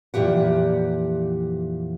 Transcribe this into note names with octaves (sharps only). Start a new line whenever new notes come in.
F2 A#2 E3 G4 F#5